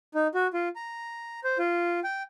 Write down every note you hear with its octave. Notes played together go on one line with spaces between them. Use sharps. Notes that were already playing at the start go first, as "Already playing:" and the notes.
D#4
F#4
F4
A#5
C5
F4
G5